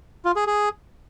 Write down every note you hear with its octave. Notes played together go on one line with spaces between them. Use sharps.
F4
G#4
G#4